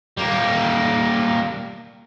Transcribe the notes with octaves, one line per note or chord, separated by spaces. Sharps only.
G3 A#3